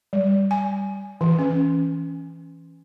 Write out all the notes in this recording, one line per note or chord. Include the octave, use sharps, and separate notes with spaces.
G3
G#5
E3
C#4